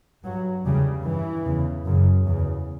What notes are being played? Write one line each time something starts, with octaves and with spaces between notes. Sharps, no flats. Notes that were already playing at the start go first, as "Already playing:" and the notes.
G2 F#3
E2 C#3 G3
G2 E3
E2 C#3
F#2 C#3
E2 C#3